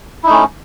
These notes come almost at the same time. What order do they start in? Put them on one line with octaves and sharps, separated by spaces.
E4 D#4 A3 C#4